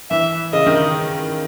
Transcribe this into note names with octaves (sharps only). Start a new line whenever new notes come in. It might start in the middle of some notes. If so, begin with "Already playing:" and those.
E3 E5
C#3 D#5
D#3